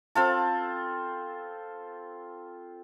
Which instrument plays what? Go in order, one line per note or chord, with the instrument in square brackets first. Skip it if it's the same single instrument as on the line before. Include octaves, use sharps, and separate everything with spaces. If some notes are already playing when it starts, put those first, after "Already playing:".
[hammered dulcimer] C4 F4 A4